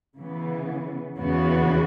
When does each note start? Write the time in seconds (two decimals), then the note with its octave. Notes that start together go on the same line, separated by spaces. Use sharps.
0.15 C#3 E3 B3
1.18 E2 C#3 E3 B3 F#4